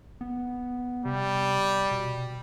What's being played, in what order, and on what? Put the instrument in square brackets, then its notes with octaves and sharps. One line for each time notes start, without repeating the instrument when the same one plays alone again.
[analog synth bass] B3
[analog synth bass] C3 [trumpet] G3
[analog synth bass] B2